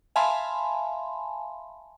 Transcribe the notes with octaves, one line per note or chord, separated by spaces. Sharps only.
E5 F5 G#5 A5 B5 C6